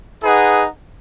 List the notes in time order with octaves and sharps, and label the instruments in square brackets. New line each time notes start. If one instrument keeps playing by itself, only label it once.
[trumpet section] D#4 G#4 B4 F#5